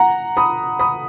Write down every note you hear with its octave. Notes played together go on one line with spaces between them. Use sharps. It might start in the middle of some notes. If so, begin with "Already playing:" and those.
Already playing: F#5 A#5
B5 D#6
B5 D#6